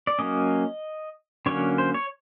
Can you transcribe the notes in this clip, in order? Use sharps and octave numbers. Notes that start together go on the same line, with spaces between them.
D5
F#3 A#3 C#4 D#5
D3 F#3 A#3 C#4 C#5
C5
C#5